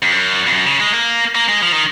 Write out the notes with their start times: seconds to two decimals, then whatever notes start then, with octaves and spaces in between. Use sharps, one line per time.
0.02 F2
0.12 F#2
0.47 F2
0.53 F#2
0.67 C#3
0.80 G#3
0.94 A#3
1.35 A#3
1.49 G#3
1.62 F3
1.72 D#3